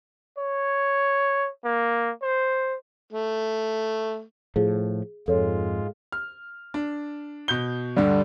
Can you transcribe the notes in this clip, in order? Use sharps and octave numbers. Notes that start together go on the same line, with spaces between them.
C#5
A#3
C5
A3
A2 F3 G#4
F2 G#2 G#3 F4 A4 C#5
F6
D4
B2 G6 G7
D2 G2 D3 G3